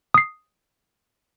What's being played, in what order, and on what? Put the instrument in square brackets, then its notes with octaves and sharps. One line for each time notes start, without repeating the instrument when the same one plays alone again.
[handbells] D#6 C7